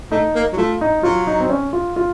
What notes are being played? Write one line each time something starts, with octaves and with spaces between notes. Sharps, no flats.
A3 D#4
A#3
F#3
A3 F4
D#4
F#3 F4
D#4
C4
C#4
F4
F4